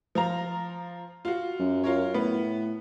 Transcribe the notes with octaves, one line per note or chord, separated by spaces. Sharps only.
F3 F4 A#5
F4 F#4
F#2
F4 A#4 C#5
A2 B3